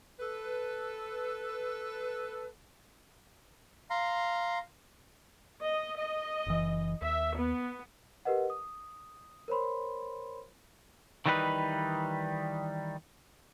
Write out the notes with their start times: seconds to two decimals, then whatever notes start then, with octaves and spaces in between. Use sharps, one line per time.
0.20 A4 B4
3.90 F5 A#5 C6
5.62 D#5
5.97 D#5
6.47 F#1 E3
7.02 D#2 E5
7.36 B3
8.25 G4 A#4 B4 D#5 F#5
8.50 D#6
9.48 A#4 C5 C#5 B5 C6
11.26 D#3 E3 G3 D#4 E4 B4